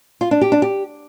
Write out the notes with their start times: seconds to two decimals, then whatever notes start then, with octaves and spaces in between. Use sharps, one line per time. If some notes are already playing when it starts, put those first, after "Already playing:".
0.21 F4
0.31 D4
0.41 G4
0.52 D4
0.62 G4